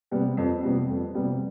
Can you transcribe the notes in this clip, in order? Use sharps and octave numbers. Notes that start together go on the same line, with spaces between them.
C3 G3 B3
F2
C3 G3 B3
F2
C3 G3 B3